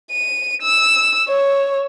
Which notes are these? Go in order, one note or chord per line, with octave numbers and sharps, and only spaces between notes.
D#7
E6
C#5